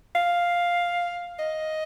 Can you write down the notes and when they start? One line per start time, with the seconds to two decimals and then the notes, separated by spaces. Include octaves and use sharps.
0.16 F5
1.39 D#5